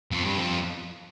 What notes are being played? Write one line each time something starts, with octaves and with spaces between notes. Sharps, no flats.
F2
G2
F2